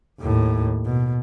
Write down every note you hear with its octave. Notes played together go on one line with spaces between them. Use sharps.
D#2 A2
B2